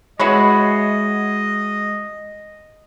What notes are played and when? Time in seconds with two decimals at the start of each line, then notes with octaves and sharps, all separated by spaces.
0.20 G#3 E4 F#4 B4 C#5 D#5